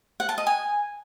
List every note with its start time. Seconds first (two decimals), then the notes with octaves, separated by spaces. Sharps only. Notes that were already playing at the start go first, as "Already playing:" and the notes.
0.20 F#5
0.29 A5
0.38 D#5
0.47 G#5